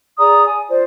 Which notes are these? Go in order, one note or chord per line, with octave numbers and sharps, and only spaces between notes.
G#4 D5 A#5 D#6
G#5
F4 C5 D5